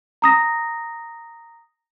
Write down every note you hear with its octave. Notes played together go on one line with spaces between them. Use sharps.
A#5 D#6 A#6